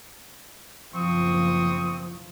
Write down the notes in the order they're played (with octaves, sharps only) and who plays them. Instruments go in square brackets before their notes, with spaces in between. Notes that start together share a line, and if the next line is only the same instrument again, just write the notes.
[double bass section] F#1 B1 F3 [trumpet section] C4 C#6 D#6